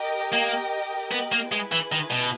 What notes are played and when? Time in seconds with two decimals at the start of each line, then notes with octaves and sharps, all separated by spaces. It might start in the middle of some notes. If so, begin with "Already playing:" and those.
Already playing: G4 A#4 D#5 G5
0.32 A#3
1.12 B3
1.32 A#3
1.51 G#3 E4 G#4 B4
1.72 E3
1.92 D#3
2.11 B2